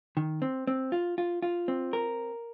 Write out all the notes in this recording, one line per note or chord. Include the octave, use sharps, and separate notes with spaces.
D#3
C4
C4
F4
F4
F4
C4
A#4